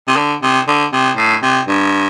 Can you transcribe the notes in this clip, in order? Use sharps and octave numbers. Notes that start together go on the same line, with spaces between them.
C3
D3
C3
D3
C3
A2
C3
G2